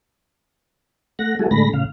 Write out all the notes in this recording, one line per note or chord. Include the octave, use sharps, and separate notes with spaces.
A3 F#5 A#6
G3 G#3 E4 F#4 G#4 A4
A2 D3 G#3 A3 B5 A#6
A2 C#3 F5